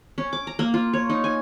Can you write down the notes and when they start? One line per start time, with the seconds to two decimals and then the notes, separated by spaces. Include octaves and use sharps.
0.18 C#4
0.33 D6
0.47 A#5
0.59 A#3
0.74 F4
0.93 C#5
1.09 D#4
1.24 G#5